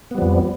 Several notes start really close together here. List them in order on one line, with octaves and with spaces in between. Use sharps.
B3 G3 F3 F2